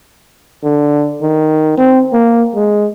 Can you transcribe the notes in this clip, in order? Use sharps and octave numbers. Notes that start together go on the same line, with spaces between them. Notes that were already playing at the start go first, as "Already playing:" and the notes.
D3
D#3
C4
A#3
G#3